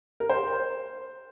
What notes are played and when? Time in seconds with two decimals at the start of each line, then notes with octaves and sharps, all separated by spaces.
0.20 A#4
0.30 C5